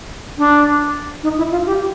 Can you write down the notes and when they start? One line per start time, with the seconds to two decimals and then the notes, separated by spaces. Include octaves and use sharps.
0.38 D4
1.23 D#4
1.38 E4
1.52 F4
1.66 G4